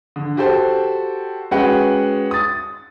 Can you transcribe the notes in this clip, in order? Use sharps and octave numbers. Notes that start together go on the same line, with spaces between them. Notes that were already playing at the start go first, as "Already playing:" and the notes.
D3
F#4 G4 A4 C5
G#3 C#4 F#4 B4 F#5 G5
D#6 A6